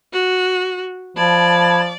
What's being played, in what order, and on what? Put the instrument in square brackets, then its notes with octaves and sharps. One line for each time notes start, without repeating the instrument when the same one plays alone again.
[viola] F#4
[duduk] F3 [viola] D5 [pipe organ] A5 B5 G#6